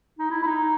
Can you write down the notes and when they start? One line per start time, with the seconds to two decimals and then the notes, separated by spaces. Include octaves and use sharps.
0.19 D#4
0.31 E4
0.42 E4
0.47 D#4